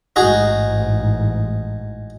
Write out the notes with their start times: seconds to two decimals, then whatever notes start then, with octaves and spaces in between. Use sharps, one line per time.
0.16 A1 G#2 D#4 F#4 G#4